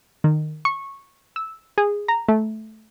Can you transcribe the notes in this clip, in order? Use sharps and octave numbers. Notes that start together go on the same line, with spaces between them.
D#3
C#6
E6
G#4
A#5
A3